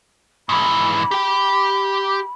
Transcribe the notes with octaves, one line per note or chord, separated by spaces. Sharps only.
G#2 E3 B5
G4 G5